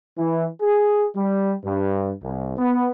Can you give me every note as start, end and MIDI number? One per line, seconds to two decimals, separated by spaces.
0.18 0.46 52
0.61 1.05 68
1.15 1.53 55
1.65 2.11 43
2.24 2.55 36
2.58 2.90 59